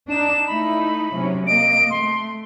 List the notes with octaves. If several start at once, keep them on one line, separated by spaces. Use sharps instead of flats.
D4 D#4 E7
A3 D#4 E4 B5
C3 F#3 C#4
A#3 D#5 D7
A3 C6